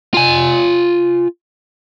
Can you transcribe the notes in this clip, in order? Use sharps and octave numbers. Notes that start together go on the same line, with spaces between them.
F4 G#5